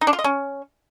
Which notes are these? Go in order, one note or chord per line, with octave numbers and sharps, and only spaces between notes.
D#4
D4
F4
D#5
C#4